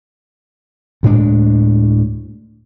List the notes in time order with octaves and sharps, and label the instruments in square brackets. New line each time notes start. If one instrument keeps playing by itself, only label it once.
[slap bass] D2 A2 G#3 D4